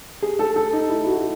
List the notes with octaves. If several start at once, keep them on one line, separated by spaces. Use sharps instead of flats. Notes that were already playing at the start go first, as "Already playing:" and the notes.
G#4
A4
A4
D#4
E4
F#4